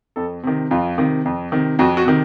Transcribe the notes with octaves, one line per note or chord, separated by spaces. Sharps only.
F2 A4
C3 D#3
F2 F4
C3 D#3
F2
C3 D#3
F2 F#4
F#4
C3 D#3